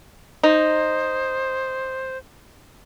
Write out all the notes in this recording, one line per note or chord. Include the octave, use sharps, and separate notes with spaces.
D#4 C5